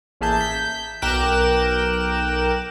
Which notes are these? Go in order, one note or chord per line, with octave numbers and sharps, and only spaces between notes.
A1 A#3 G#4 E5 A5 G6
G6 B6
B1 A#4 G5 D6 F#6 E7